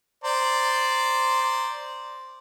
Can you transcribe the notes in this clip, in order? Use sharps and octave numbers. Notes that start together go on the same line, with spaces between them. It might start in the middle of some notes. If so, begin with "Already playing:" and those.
C5 D5 A#5